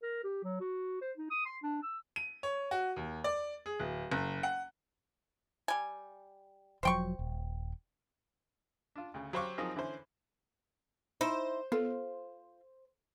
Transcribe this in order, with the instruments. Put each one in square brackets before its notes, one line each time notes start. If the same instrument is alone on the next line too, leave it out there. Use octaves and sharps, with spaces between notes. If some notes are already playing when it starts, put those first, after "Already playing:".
[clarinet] A#4
G4
F#3
F#4
C5
D#4
D#6
C6
D4
E6
[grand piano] D#7
C#5
F#4
D#2
D5
G#4
D1
F#1
F#5
[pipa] G3 G#5
[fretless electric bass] E1 F3 F#3 [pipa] C5 G5 C#6
[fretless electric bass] D#1
[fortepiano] D4 F4
D2 C#3
F#3 G4 C5 F5 C#6 D6
F3 F#3 C4 D#4 G#4 A#4
D3 E3 C#4 C5
[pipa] D#4 E4 [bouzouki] C5
[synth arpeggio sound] B3 [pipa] F4 [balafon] A4